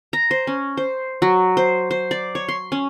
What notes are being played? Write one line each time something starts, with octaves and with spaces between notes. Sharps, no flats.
A#5
C5
C#4
C5
F#3
C5
C5
D5
C#5
C6
C#4